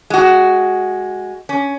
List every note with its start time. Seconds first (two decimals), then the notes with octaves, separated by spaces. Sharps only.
0.10 G#3 F#4
1.49 C#4